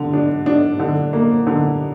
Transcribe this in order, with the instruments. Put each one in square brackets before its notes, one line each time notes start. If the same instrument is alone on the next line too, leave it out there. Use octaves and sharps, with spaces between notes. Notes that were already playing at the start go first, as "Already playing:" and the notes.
Already playing: [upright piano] D3
D4
D4
D3
A#3
D3